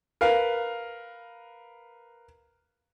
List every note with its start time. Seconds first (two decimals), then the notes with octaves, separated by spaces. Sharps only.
0.21 A#4 B4 F5